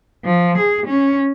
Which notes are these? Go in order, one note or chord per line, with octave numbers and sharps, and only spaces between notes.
F3
G#4
C#4